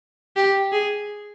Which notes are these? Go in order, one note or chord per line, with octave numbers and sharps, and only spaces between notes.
G4
G#4